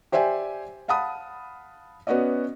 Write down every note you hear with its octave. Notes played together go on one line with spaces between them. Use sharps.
G4 C5 D5 E5 G#5
F5 F#5 A5 B5 D#6
B3 C#4 F#4 D5 D#5